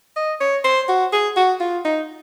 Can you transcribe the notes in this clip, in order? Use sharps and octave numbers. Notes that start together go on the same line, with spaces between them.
D#5
C#5
C5
F#4
G#4
F#4
F4
D#4